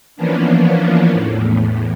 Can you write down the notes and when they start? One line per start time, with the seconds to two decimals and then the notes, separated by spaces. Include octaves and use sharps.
0.16 E3 F3 A#3 B3 C#4 D4
1.12 E2 A2